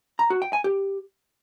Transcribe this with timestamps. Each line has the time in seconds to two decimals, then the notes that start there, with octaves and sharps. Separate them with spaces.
0.19 A#5
0.30 F#4
0.42 G5
0.53 G#5
0.64 G4